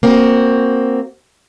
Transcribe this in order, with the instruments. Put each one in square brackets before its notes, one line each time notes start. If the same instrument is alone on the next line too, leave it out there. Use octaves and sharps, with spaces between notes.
[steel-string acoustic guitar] A#3 C4 F#4